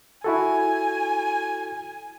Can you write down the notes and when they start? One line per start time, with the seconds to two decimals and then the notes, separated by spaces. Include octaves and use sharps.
0.24 E4 F#4 A4 G#5